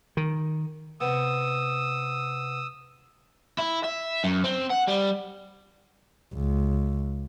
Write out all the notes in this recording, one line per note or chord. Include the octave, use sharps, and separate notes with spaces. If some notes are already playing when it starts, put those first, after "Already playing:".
D#3
C3 B3 D#6 E6
E4
E5
F#2
C4
F#5
G3
C#2